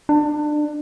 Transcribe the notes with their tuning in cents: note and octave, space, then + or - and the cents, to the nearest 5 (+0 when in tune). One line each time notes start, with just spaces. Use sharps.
D4 +25